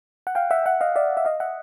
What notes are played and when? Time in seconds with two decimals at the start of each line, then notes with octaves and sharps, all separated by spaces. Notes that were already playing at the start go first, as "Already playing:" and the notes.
0.27 F#5
0.35 F5 G5
0.51 E5 F#5
0.66 E5 F#5
0.81 D#5 F5
0.96 D5 E5
1.17 E5
1.25 D#5 F5
1.40 E5 F#5